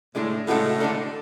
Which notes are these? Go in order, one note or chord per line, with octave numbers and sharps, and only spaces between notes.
A2 D3 G#3 D4 G#4
A2 C#3 G#3 B3 F#4 A4
D3 G#3 D4 A4